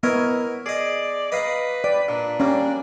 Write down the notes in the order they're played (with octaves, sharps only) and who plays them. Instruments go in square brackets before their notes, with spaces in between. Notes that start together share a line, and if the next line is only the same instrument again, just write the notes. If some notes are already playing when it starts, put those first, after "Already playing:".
[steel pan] B3 [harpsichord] E4 C#5 D#5 [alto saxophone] A#4
[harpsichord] G#4 D#5 [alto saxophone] D5
[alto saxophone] B4 [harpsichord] D#5 F5 A#5
[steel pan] D5 [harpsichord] G5
[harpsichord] A#2 [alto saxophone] D4
[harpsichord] G3 A#3 [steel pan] C#4